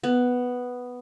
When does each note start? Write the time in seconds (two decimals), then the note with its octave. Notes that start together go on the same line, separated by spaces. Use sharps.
0.03 B3